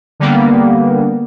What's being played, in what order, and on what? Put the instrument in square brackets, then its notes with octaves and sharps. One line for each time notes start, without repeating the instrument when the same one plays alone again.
[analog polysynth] D3 G3 A#3 B3